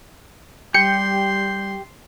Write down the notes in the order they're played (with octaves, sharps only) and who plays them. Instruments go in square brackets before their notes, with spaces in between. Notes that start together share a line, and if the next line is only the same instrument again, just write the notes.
[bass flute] G3 [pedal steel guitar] G4 G5 [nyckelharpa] C6 [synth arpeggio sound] C#7